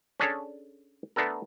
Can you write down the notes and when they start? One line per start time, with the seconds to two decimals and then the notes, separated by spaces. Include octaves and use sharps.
0.20 C#4 D4 G#4 A4 C#5
1.16 A3 B3 D4 A4 A#4